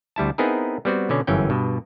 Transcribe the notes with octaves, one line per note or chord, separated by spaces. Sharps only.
D2 G3 E4 A5
B3 C4 D#4 E4 G#4 A#4
G3 B3 C4 F#4
B2 D3 C#4
G1 F#2 E3 C#4 G5
G2 B2